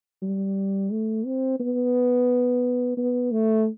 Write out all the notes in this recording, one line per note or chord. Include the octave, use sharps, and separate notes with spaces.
G3
A3
C4
B3
B3
A3